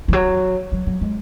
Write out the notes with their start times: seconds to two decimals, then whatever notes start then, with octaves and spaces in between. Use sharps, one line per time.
0.08 E3
0.13 F#3
0.72 F#3
0.87 F#3
1.01 G#3